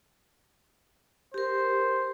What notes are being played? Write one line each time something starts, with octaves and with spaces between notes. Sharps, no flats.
G4 A#4 C5